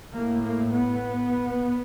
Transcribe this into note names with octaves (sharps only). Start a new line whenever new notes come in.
A2 A#3
A#3
B3